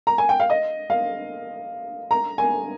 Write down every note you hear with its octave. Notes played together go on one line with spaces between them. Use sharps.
A#5
G#5
G5
F5
D#5
F5
A#5
G#5